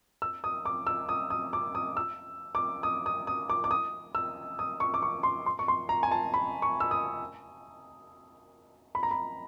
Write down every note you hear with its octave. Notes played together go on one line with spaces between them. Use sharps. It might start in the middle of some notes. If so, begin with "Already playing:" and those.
E6
D#6
D6
E6
D#6
D#6
D6
D#6
E6
D6
D#6
D#6
D#6
D6
D6
D#6
E6
D#6
C#6
D6
C#6
C6
C6
C#6
C6
A#5
G#5
A5
B5
C#6
E6
D#6
B5
A#5
B5